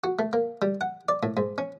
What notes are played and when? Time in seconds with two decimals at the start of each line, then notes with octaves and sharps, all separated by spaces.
0.04 F#4
0.19 A3
0.33 A#3
0.62 G3
0.81 F#5
1.09 D5
1.23 A2
1.37 G#2
1.58 C#4